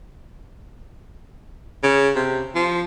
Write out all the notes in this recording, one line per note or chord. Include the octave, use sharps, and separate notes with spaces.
C#3
C3
F3